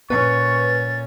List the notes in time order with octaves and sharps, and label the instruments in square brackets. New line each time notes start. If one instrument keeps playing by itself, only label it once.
[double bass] A#2 C#4 [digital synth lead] B4 [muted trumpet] C#6 [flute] A6